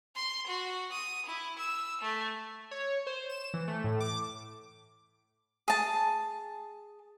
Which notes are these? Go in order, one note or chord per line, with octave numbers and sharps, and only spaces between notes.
C6
F#4
D#6
E4
E6
A3
C#5
C5
E7
E3
A3
A2
D6
G#4 A5